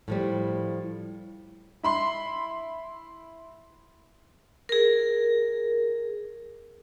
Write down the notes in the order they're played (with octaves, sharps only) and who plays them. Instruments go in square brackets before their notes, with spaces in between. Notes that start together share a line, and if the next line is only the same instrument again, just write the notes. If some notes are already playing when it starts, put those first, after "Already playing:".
[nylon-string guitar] A2 F3 G3
[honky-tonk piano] E4 B5 C6
[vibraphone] G#4 A#4